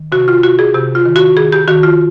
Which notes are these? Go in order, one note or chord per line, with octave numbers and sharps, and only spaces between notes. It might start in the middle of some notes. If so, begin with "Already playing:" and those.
Already playing: D#3
C3 F#4
F4
C3 F#4
G#4
C3 G4
F4
D#3
F#4
D#3 G#4
G4
D#3 F#4
F4